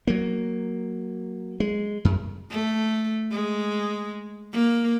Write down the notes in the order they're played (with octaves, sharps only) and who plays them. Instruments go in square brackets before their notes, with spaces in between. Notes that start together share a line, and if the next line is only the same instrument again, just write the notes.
[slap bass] F#3 A#3
G#3
F#2
[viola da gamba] A3
G#3
A#3